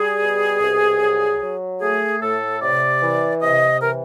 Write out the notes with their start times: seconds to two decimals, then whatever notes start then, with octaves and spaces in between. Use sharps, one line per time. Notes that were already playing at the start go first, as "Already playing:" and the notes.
Already playing: G3 G#4
0.21 B2
0.62 C2
1.02 F#3
1.42 F#3
1.81 A3 G#4
2.21 A2 A4
2.61 C3 D5
3.02 E3
3.42 C3 D#5
3.82 E3 A#4